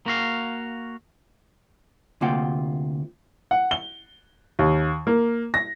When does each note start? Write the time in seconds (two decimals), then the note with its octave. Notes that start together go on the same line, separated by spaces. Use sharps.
0.06 A#3 F#4 F5
2.21 D2 C3 A#3 F4 F#5 G5
3.51 F#5
3.71 G7
4.59 D#2
5.07 A#3
5.54 A#6